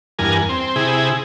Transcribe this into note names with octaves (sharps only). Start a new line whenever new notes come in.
E2 G2 A#4 G#5
C4
C3 E4 G#4